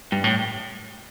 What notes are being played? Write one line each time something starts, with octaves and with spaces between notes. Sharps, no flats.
G2
A2